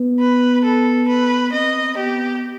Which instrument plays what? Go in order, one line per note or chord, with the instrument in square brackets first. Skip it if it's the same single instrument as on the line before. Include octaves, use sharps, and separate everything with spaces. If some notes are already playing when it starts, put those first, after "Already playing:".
Already playing: [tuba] B3
[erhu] B4
A4
B4
[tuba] C4 [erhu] D#5
[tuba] B3 [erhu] G4